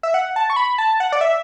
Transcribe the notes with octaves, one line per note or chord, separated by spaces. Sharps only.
E5
F#5
A5
C#6
B5
A5
F#5
D5
E5